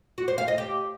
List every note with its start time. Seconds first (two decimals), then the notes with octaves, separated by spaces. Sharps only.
0.18 F#4
0.28 C5
0.38 F5
0.48 D#5
0.58 G4